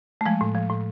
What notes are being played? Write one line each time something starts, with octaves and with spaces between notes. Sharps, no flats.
A3
F3 G#3
A2
F3
A2